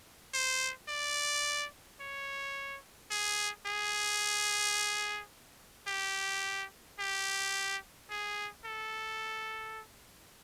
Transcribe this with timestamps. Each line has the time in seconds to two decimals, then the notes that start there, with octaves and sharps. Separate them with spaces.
0.33 C5
0.88 D5
2.00 C#5
3.11 G#4
3.66 G#4
5.87 G4
6.99 G4
8.10 G#4
8.65 A4